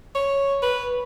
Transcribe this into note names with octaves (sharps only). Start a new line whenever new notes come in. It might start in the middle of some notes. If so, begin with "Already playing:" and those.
C#5
B4